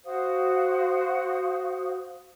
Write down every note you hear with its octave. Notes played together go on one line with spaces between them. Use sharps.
F#4 C5 F5 D#6